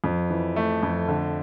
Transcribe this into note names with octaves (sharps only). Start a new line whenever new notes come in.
F2
E3
A3
F2
D3